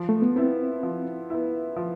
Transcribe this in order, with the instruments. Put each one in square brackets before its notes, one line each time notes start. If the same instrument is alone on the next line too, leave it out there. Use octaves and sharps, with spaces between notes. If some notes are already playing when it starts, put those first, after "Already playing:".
Already playing: [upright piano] F3
[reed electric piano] A3
B3
[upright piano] B3 E4 [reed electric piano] C4
[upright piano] F3
B3 E4
F3